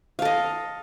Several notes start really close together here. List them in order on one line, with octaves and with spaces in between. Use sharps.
F5 A4 D#5